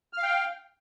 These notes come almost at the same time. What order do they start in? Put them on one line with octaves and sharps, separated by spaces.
F6 F5 G5